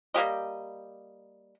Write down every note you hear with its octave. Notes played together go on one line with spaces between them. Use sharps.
G3 A#3 G4 D#5